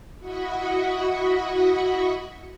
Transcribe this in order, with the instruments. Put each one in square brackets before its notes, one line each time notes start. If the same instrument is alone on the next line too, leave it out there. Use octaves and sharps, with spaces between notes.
[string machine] E4 F#4 D#5 F#5 B5 C#6